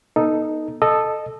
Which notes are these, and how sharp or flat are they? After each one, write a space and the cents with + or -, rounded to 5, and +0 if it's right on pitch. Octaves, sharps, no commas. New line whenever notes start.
B3 -40 D#4 +0 A4 +0
A4 +0 D#5 -20 A5 -5